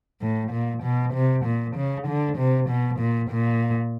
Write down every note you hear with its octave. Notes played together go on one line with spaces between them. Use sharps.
A2
A#2
B2
C3
A#2
C#3
D3
C3
B2
A#2
A#2